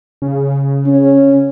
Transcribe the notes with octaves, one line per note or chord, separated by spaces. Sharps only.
C#3
C#4